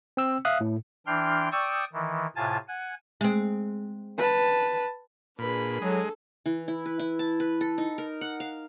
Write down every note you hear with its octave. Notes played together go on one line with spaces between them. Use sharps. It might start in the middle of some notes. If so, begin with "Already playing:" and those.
C4 E6
E5 F5 D#6 F#6
A2
E3 D4 G5 C6 F6
D5 G5 C#6 D#6 E6
D#3 E3
A2 C3 F4 G#5 A5 A6
F#5 G#5
G#3 C4
B4 A5
A#2 D4 G#4 B4 B5
F#3 G#3 A4
E3
E4
B4
E4
A5
B4
A4
D#4
A#4
F#5
F5